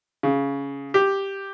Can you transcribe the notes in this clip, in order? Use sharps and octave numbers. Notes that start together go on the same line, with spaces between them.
C#3
G4